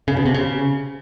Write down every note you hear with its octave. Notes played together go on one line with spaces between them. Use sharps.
C#3
B2
C3
C#3